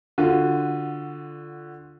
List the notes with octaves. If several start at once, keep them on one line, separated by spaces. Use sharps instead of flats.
D3 F4 F#4